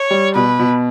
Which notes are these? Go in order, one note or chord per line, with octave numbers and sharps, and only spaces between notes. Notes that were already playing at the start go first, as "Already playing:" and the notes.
Already playing: C#5
G3
B2 B4
B2